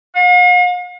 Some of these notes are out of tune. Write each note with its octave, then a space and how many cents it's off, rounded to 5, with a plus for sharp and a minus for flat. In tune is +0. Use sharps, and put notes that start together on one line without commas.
F5 +45